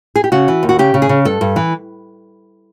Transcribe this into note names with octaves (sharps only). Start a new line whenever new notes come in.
G#4
G4
C#3 F#4
E3
D#2
F#4
C#3 G4
C#3
G#4
C#3
G2 A4
G2
E3